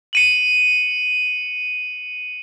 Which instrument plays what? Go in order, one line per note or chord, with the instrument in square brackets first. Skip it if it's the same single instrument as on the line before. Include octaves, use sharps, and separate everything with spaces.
[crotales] C#7 D#7 F#7